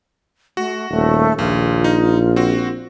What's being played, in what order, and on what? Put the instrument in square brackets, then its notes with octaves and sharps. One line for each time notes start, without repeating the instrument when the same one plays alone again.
[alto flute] A3 [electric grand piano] F#4
[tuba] D#1 [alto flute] A3
[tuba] A#1 [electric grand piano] D#2 [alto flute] F4
[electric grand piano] D#4
C4 F#4